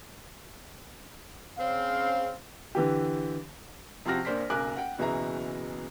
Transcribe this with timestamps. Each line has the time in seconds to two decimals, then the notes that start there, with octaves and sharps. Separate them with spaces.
1.58 C#3 C4 F5
2.75 D3 E3 G4
4.05 C3 F3 C4 F#4 F6 A#6
4.25 A#1 A#3 C5 D5 B6
4.50 F#1 B1 A#4 G#5 D6 F#6
4.76 F#5 G5
4.98 F#1 B2 E3 G#4 E5 A#5